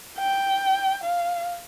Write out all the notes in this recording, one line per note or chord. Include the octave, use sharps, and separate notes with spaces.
G5
F5